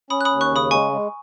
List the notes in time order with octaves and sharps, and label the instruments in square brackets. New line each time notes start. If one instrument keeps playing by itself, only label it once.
[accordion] C#4 [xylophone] B5 D#6
[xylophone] F#6
B5 D#6
[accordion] D#2
[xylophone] C#6 F#6
[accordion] C#3 [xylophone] B5 D#6
[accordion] G#3 [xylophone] G#5 C#6
[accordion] G#3